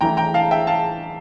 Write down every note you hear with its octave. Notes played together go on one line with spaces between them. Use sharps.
E2 E3 A3 E4 G5 A#5
G5 A#5
F5 A5
E5 G5
F5 A5